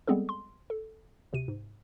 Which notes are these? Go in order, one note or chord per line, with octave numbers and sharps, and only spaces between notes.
G3 G#3 B3 C4 G#4 A4
C6
A4
D2 C3 D#7
G#2